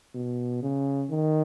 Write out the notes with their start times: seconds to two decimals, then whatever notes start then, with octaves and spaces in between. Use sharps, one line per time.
0.15 B2
0.63 C#3
1.11 D#3